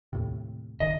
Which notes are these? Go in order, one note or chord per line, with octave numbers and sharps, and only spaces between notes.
D#2 A2 C3
F#1 D#3 D#5